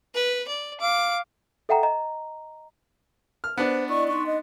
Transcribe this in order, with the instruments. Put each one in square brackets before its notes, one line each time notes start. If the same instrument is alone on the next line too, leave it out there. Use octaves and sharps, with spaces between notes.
[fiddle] B4
D5
[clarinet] F5 [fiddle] D6
[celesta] A4 E5 F#5 G5 A#5
D#5 A#5
[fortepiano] F6
[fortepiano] B3 D4 [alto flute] C5
[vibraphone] E4 D5 D#5 [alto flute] C#6
[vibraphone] D#4 C6 [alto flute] C#6
[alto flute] D#5